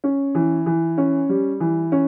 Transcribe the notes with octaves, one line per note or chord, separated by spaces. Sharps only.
C#4
E3
E3
C#4
G3
E3
C#4